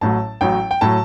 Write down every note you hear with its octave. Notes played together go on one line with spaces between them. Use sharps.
A1 A2 F#3 A5
A1 A2 F#3 G5
G5
A2 F#3 A5